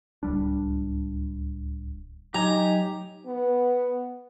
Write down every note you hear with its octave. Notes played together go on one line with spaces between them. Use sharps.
D1 C#2 G3 D4
F#3 D#4 G4 G#5 A#5
B3